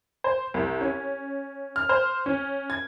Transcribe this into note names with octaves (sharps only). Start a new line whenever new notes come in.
C5
C2
C#4
F6
C5
C#4
G#6